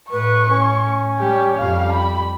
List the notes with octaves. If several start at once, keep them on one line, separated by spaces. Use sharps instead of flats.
A2 B4 C#6
C#4
G3 G4
F2 G3 F5
B5